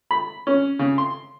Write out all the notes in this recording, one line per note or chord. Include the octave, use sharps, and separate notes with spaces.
B5
C#4
C#3
C6